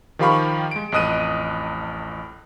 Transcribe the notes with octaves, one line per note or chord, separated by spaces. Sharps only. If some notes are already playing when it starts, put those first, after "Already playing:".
D#3 F3 G4 F5 B5 C#6
G#3 D7
A1 F2 D#5 D#6 F#6 D#7